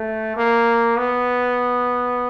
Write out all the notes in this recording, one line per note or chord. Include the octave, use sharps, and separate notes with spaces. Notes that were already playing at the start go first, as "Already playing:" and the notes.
Already playing: A3
A#3
B3